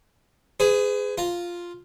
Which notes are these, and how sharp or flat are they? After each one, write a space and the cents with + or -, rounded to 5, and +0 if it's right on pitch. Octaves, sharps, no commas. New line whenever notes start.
G#4 +0 B4 +45
F4 +0 A#5 +0